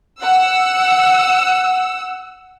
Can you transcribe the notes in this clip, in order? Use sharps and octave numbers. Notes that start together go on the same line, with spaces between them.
F#5 E6